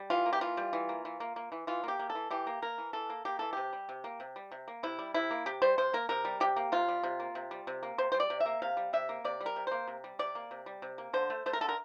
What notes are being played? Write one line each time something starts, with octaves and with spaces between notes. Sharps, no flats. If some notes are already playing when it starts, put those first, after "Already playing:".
Already playing: G3
E3 F4
A#3
G4
E3 F4
G3
E3
A#3
E3
A#3
A#3
E3
E3 F4
A#3 G4
A#3
A4
E3
E3 G4
A#3
A#3 A#4
E3
E3 A4
A#3
A#3 G4
E3 A4
C3 G4
G3
C3
A#3
C3
G3
C3
A#3
C3 E4
G3
C3 E4
A#3
C3 G4
G3 C5
C3 C5
A#3 A#4
C3 A#4
G3
C3 G4
A#3
C3 F4
G3
C3
A#3
C3
G3
C3
A#3
C3 C5
G3 C5
D5
C3
E5
A#3
C3 F5
G3
C3 E5
A#3
C3 D5
G3
A#4
C3
A#3 C5
C3
G3
C3 D5
A#3
C3
G3
C3
A#3
D3 C5
A3
A3 C5
A#4
D3 A4
A#4